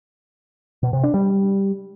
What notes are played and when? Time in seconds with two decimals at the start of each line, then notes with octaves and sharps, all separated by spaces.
0.83 B2
0.93 C3
1.04 D4
1.14 G3